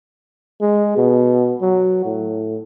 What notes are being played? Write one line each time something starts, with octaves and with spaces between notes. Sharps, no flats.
G#3
B2
F#3
A2